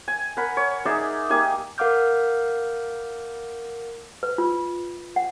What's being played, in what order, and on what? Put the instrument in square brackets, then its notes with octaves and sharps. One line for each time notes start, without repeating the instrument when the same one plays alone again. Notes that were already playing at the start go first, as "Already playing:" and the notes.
[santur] G#5
A#4 F#5 B5
C#5
D#4 G#4 D5 E5
A#3 D#4 G4 G#5
[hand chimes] A#4 F5 F#5 D6 F6 G6
[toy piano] B4
F4
F#5